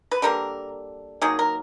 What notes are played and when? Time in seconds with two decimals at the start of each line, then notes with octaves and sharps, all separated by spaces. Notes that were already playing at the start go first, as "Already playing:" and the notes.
0.11 B4
0.22 D3 G3 A#3 A#4
1.21 D#3 F#3 A#3 G#4
1.39 A#4